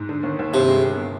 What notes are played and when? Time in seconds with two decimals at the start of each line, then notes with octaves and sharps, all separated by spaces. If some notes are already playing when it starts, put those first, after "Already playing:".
Already playing: G#2
0.09 D3
0.23 D#2
0.39 D#2
0.53 G2 C3
0.68 G#3
0.83 G1
0.98 C3